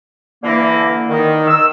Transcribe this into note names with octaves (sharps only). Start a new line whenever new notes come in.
D3 E3 A#3
D#3
E6